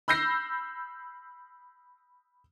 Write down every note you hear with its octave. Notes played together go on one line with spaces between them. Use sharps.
B5 E6 G6 A#6 C7